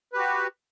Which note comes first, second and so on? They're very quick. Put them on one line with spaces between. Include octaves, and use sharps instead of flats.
B4 G4 F#4